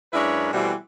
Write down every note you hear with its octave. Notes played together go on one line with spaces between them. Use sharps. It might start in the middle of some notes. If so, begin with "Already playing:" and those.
F#2 G#3 D4 E4 B4 C#5
B2 E3 G3 A3 C4